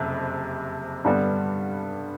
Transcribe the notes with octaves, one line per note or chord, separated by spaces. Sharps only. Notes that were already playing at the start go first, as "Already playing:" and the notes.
Already playing: F#1 F2 C3
G2 D3 G3 B3